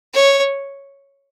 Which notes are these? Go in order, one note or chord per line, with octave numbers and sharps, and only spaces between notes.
C#5